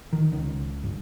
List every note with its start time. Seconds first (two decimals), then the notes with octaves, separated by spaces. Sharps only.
0.13 D#3
0.32 C#2
0.83 G1